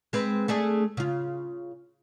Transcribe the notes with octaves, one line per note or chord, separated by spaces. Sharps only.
G#3 C4 B4
A3 D4 G#4
C#3 F4